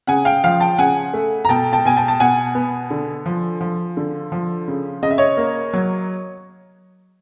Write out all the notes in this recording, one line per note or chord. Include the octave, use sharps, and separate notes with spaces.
C#3 F#5 G#5
F5 G5
F3 F5 G5
G5 A5
C#3 F#5 G#5
A3
A#5
B2 G5 A5
G5 A5
B2 G#5
G5 A5
A5
B2 F#5 G#5
B3
D3
F3
F3
D3
F3
C#3
C#3 D#5
E5
C#5 D#5
A#3
F#3